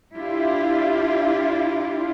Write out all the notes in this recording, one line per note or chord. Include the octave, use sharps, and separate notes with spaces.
D4 E4 F4 G4